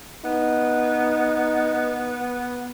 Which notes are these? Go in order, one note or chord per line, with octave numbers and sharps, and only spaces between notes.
B3 D#4